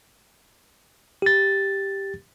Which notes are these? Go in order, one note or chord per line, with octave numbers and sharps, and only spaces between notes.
G4 A6